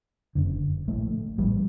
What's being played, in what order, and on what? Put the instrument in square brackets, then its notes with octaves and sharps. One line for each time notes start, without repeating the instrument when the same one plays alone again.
[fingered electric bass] F#1 F#2 D3
A#1 A2 A3
A#1 A2 G3